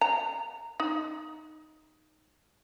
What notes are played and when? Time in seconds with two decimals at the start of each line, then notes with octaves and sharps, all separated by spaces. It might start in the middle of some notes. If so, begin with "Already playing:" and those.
0.01 A#5
0.80 D#4